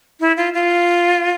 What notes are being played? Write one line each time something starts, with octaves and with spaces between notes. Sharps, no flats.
E4
F4
F4